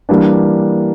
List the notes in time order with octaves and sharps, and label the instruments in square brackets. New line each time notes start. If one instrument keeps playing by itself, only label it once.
[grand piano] E3 G3 A#3 D4